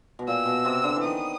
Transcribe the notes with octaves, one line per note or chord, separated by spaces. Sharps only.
B2
A#2 E6
B2
C3
D3
E3
D#3 D#6